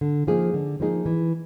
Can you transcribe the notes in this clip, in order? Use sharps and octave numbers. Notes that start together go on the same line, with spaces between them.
D3
F3 A#3 D#4 G#4
D3
F3 A#3 D#4 G#4
E3